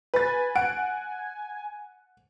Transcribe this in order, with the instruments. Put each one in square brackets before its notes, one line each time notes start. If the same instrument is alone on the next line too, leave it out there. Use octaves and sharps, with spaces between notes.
[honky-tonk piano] B4 A6 [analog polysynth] G#5
[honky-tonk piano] F#5 D7